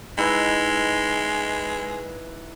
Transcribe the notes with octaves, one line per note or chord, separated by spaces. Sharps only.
G#3 D#4 E4 B4